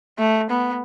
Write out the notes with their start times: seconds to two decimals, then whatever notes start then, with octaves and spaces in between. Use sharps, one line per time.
0.19 A3
0.50 B3